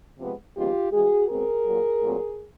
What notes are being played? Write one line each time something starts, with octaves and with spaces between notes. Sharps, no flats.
C3 F3 G#3 B3
D#2 C#3 F3 G#3 B3 F4 G4
G2 E3 G#3 F#4 G#4
B2 G#3 C4 G#4 A#4
A#2 F#3 A#3
A#2 F#3 A3 C4